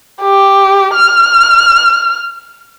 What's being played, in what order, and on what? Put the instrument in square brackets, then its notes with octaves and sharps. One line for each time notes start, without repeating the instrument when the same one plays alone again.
[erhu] G4
F6